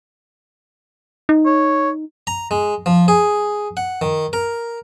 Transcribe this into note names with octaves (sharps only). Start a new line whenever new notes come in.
D#4
C#5
A#5
G#3
F3
G#4
F#5
D#3
A#4